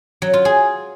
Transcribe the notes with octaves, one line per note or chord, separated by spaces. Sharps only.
F#3
F4
G#4